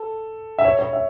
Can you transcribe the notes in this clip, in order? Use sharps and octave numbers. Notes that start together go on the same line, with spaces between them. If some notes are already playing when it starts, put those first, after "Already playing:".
Already playing: A4
E5
C#5
C#5
E5